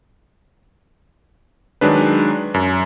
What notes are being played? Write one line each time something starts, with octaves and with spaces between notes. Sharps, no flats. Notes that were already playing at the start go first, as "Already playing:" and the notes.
D#3 F#3 G#3 D4 B4
F#2